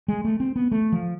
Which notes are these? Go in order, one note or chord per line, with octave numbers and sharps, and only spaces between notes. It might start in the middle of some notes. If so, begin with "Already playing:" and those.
G#3
A3
C4
B3
A3
F3